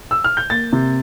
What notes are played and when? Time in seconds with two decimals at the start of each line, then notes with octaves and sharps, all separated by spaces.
0.11 E6
0.24 F6
0.37 G6
0.50 A#3 A6
0.73 C3